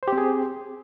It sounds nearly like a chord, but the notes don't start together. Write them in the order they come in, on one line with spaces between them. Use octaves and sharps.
C5 G4 C4 G#4